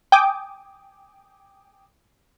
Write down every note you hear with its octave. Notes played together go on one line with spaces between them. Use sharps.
G5 G#5 D6 D#6